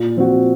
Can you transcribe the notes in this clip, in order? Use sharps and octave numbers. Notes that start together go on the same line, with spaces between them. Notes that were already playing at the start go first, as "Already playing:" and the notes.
Already playing: A#2
F3 C4 F#4